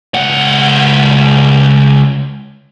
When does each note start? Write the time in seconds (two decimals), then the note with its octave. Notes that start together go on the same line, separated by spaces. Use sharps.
0.14 C#2 F#5